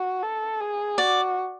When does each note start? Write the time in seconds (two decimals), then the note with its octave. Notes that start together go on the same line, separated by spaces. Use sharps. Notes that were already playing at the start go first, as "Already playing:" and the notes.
Already playing: F#4
0.22 A4
0.61 G#4
0.98 F#4 D5